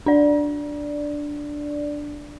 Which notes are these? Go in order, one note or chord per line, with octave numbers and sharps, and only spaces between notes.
D4 D5